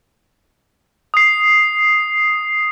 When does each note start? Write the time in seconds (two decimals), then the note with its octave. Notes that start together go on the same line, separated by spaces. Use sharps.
1.14 D#6 C7